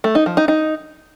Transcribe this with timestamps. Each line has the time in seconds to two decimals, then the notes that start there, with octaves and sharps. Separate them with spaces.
0.04 A3
0.15 D#4
0.26 F3
0.37 D#4
0.48 D#4